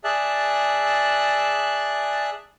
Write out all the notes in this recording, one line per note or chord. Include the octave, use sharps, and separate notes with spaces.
G#4 D5 E5 A5 F#6